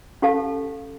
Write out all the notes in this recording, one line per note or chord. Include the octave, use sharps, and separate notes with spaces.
C#4 G4 A4 F5 A5